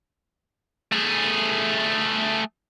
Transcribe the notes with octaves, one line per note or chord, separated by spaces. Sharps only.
A3 G#4